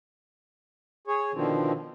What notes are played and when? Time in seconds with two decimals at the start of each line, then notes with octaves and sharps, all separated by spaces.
1.07 G#4 C#5
1.33 B2 D3 D#3 F3 C4